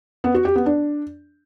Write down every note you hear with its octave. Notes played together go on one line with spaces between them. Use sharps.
B3
F#4
G4
B3
D4